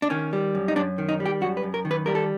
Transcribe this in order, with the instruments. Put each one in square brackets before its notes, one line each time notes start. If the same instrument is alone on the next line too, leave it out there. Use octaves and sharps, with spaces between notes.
[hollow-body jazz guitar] D4
D#3 C#4
G3
F#2
D#4
F#2 D4
D#3
D#4
G3
G4
F#2 F#4
B4
F#2
A#4
D#3
B4
G3 A#4
A4